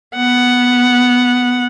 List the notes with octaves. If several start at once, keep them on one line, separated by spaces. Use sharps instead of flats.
B3 F#5